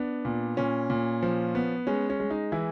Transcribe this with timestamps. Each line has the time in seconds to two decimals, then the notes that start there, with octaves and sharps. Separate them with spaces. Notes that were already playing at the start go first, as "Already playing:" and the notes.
Already playing: B3 D4
0.25 A#2
0.57 A#2 C#4
0.90 A#2
1.22 F3
1.55 B3
1.87 G#3 C#4
2.10 C#4
2.20 G#3
2.30 D#4
2.52 E3 E4